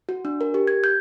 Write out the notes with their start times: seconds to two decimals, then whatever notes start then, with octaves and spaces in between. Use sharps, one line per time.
0.09 F#4
0.25 D4
0.41 A#4
0.54 G4
0.67 G#6
0.84 G6